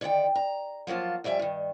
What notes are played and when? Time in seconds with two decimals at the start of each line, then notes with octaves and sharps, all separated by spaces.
0.01 D3 D#3 D5 F5 G5
0.35 A#5
0.87 F3 F#3 A#3 F4 A5
1.24 F2 G3 E5 G5 G#5
1.39 G2 D#3